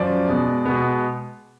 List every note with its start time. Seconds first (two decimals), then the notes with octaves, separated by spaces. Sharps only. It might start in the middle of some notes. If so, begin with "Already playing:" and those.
Already playing: F#2 F3 D5
0.27 B2 G#3 B3
0.65 B2 G#3 B3